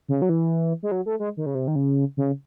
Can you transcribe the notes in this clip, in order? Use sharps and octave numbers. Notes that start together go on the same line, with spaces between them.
C#3
F#3
E3
G#3
F#3
A3
G#3
D#3
C#3
C3
D#3
C#3
C#3